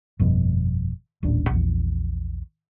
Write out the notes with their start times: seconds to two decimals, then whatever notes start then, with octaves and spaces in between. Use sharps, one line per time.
0.19 G1 F2 B2
1.23 D#1 A1 A#2 D4
1.50 A#1 E2